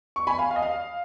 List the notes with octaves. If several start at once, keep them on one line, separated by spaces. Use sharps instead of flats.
C#6
G#5 B5
F5 G#5
F5
D#5
F5